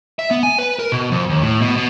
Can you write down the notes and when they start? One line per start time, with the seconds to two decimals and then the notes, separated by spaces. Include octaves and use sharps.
0.19 E5
0.31 B3
0.43 G#5
0.58 B4
0.79 A#4
0.92 B2
1.11 F2
1.29 D#2
1.42 A2
1.61 B2
1.77 B2